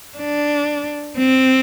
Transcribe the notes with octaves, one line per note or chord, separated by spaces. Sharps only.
D4
C4